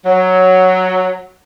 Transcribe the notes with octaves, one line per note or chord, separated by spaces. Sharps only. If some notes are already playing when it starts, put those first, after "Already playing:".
F#3